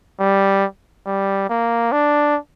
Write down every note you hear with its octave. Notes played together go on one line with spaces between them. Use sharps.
G3
G3
A#3
D4